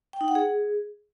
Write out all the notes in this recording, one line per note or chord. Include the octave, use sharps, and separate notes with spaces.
G5
D#4
F#5
G#4